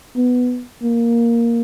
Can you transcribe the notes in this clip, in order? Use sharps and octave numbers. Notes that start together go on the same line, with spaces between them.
B3
A#3